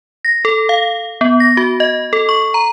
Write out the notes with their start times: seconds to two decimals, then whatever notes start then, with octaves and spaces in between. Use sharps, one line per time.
0.25 A#6
0.45 A4
0.69 F5
1.21 B3
1.40 A#6
1.57 F#4
1.80 D#5
2.13 A4
2.29 C#6
2.54 A#5